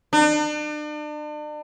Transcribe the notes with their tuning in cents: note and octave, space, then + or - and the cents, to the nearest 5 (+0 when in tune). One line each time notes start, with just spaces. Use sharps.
D4 +40